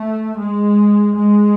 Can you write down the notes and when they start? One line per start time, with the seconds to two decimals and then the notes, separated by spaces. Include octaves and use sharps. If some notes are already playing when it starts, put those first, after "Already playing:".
Already playing: A3
0.37 G#3
1.15 G#3